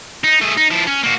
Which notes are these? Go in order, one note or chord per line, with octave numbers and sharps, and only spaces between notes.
D#4
A3 G#4
D#4
F3 E4
C#4
A#3 F#4